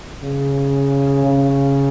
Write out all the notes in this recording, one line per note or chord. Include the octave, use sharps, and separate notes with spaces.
C#3
C#3